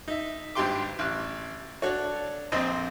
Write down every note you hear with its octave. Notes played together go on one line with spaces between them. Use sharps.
D#4 E5
G#1 G2 G4 G5 C6 D6
A1 F#6
D4 F#4 A4 C#5
A#1 F2 C4 C5 D#5 E6